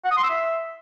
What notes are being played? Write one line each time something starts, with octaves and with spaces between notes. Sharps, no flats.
F#5
D#6
C6
E6
E5